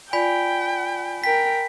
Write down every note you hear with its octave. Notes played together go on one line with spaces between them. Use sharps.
F4 D5 G5 G#5 B5 B6
A#4 G5 B6